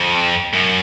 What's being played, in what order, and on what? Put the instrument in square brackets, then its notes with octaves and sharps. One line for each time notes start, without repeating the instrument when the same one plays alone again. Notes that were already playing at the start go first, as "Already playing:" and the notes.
Already playing: [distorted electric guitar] F2
F#2